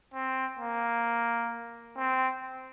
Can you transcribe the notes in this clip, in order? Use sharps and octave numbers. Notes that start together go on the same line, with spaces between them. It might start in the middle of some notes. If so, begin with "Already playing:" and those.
C4
A#3
C4